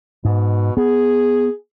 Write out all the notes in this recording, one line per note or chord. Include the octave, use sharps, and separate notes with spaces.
G#2 B2
B3 G#4